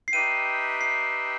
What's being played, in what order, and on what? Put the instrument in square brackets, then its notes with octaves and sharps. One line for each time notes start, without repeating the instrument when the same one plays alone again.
[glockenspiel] C7
[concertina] D#4 G4 B4 E5 G5 [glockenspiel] D#7
[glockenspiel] C7